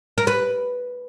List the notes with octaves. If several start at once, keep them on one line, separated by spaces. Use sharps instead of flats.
A#4
B4